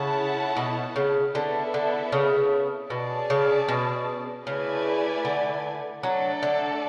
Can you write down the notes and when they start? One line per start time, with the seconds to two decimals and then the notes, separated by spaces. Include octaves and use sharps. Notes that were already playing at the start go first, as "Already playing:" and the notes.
Already playing: C#3 E4 A4 C#5 F#5 A5
0.57 B2
0.96 C#3
1.35 D3 B3 E4 A4 E5
1.74 D3
2.12 C#3
2.90 B2 C#4 G#4 D5 A5
3.30 C#3
3.68 B2
4.46 C#3 A3 E4 B4 D5 G#5
5.25 D3
6.03 F#3 A3 D4 A4 D5
6.43 D3